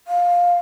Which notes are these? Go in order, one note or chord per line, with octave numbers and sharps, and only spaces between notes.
F5